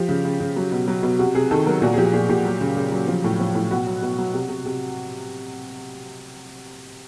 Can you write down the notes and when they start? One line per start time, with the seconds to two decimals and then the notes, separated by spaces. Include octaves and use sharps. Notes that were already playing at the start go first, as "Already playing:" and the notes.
Already playing: F3 G4
0.09 C#3
0.25 C#3
0.40 C#3
0.56 F#3
0.72 B2
0.88 F#3
1.03 B2
1.19 C3 F#4
1.35 C3 G#4
1.51 D#3 A4
1.67 F#3 A#4
1.82 A#2 F#4
1.93 G#4
1.98 F3 G4
2.14 A#2 G#4
2.29 A#2 G4
2.45 F#3
2.61 C#3
2.77 C#3
2.92 F#3
3.08 F3
3.24 A2
3.39 F3
3.55 A2
3.71 B2 F#4
3.87 F#3
4.02 B2
4.19 F#3
4.34 C3
4.49 C3
4.66 C3